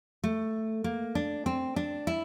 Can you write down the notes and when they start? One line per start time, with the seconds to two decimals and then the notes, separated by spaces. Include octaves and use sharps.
0.24 A3
0.84 A#3
1.15 D4
1.46 C4
1.76 D4
2.07 E4